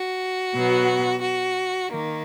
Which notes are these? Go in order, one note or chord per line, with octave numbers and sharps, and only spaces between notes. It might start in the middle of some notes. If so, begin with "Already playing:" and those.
Already playing: F#4
B2 F#3 B3
F#4
D#3 A#3